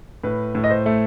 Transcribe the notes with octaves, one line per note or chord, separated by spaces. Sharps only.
A2 B4
A2
D#5
C5
A3